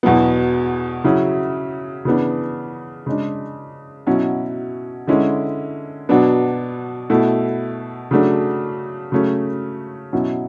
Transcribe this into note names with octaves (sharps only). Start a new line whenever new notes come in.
E2 B2 F#3 B3
C#3 F#3 C#4 E4
C#3 E3 B3 D4
C#3 G#3 D4
B2 F#3 C#4 E4
D3 G#3 C#4 E4
B2 F#3 B3 D4
B2 A3 E4
C#3 F#3 A3 D4
C#3 F#3 A3 C#4
B2 F#3 C#4 E4